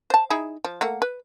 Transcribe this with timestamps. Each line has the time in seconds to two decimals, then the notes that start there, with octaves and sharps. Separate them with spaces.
0.10 C5 A5
0.30 D#4 E4 G#4
0.64 F3
0.81 A3 A#3 F#5
1.02 B4